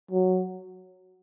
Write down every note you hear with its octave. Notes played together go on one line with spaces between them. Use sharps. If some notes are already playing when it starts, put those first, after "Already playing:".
F#3